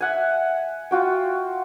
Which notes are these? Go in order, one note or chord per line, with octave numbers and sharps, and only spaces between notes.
E5 F#5 G#5
F4 F#4 G5